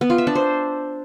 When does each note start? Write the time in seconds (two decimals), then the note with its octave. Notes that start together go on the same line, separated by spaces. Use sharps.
0.01 B3
0.10 F4
0.18 E5
0.27 D4
0.35 C5